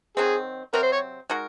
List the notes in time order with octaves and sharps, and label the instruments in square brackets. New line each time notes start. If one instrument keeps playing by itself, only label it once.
[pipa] D#3 F#3 C4 [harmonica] G#4
[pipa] C3 F#3 C4 [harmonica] A#4
[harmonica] C5
C#5
[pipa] G#3 D#4 F#4 A#4